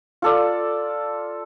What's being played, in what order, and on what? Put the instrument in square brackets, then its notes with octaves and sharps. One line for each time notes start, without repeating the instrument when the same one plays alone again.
[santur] F4 A4 D5